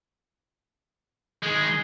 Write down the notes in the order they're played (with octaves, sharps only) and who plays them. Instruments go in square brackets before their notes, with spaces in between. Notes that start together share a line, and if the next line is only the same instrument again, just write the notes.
[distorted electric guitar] D#3 G#3 [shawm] G#4